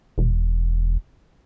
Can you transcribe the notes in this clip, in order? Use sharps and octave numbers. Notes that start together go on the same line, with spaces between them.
E1